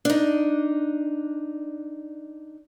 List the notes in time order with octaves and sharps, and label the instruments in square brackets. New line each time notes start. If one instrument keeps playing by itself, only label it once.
[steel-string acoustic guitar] D4 D#4